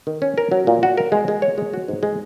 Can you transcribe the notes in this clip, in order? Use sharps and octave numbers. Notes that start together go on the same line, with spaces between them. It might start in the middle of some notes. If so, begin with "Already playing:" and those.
D#3
C#4
A#4
F#3
A#2
F#4
A#4
G#3
G#3
C#5
G#3
F#4
G#2
G#3